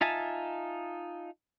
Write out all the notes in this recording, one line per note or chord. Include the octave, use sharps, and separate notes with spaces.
D#4 F4 E5 G#5 A5